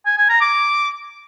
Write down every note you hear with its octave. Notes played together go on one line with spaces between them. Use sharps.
G#5
G#5
A#5
D6